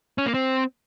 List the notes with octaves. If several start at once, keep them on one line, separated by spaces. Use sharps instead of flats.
C#4
A#3
C4